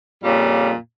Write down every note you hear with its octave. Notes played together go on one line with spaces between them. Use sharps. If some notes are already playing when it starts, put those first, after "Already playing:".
F2 A#2 C#3 G3